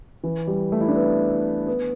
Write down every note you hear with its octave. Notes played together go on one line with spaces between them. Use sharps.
E3
G3
A3
E4
D4
B3
B3